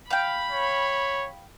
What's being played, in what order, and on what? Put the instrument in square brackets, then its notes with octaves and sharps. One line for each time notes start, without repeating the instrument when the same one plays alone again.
[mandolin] F5 G5 [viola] B5
[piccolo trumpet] C#5